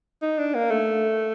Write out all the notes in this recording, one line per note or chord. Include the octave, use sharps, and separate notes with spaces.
D#4
D4
A#3
A3